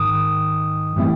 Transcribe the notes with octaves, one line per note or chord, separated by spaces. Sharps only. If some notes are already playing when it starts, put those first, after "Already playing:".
Already playing: G#2 D#3 D#6
A2 E3 G3 C4 E4